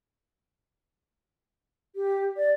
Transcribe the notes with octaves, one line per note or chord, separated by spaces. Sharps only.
G4
D5